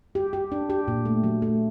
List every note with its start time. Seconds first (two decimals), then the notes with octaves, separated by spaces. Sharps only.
0.15 G4
0.33 G4
0.52 D4
0.70 G4
0.88 A#2
1.05 A3
1.24 F#3
1.42 A3